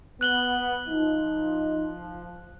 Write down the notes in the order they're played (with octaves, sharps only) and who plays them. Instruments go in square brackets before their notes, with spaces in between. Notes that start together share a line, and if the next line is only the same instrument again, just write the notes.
[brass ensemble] B3 [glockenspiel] F#6 F#7 G7
[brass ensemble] F3 [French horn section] D#4